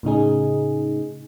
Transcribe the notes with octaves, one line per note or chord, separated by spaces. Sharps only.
A2 C#3 D#4 G#4